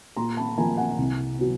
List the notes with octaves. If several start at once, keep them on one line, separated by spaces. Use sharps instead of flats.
A#2 A#5 C6
A5 B5
F3 A#3 G#5 A#5
F#5 G#5
C2
F#3 B3